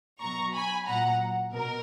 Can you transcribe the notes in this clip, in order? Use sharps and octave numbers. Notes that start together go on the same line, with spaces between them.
B2 F#3 A#5 C#6
G#5 B5
A#2 F#3 F#5 A#5
B2 A#4